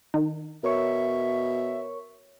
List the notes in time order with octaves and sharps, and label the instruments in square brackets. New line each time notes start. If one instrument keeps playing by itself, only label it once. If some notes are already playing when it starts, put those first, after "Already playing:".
[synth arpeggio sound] D#3
[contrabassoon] B2 [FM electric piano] A#4 C#5 C#6 [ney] E5